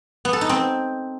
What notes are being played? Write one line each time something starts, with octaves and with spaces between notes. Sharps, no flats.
B3
A4
D#4
C4